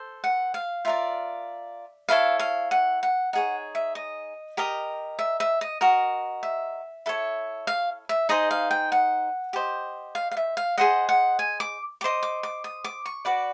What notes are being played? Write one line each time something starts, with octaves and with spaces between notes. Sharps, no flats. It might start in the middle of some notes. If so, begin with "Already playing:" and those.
Already playing: A4 C5
F#5
F5
F4 A#4 D5 E5
E4 A4 C#5 F5
F5
F#5
F#5
D#4 G#4 C#5 F#5
E5
D#5
G4 A#4 D#5
E5
E5
D#5
F#4 A#4 D#5
E5
E4 A4 C#5
F5
E5
D#4 G#4 C5 D#5
F5
G5
F#5
G4 C5 D#5
F5
F5
E5
F5
G#4 C5 D#5 F#5
F#5
G#5
D6
G4 C5 D#5 D6
D6
D6
D#6
D6
C#6
F#4 B4 D5 D6